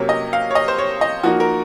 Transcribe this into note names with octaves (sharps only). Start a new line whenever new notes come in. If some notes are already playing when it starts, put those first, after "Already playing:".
Already playing: C3 F#3 A#3 C#4 C#5
D#5
F5
C#5
D#5
C5
C#5
D#5
F3 A#3 D#4 F#4
A#4